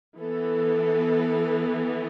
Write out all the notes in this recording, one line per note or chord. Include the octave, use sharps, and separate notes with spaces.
E3 B3 A4